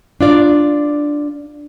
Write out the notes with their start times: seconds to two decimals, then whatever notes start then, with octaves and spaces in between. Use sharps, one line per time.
0.21 D4 F4 D5